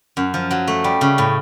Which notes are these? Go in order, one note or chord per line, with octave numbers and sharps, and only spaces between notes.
F#2
F3
F#3
A3
G3
C#3
A2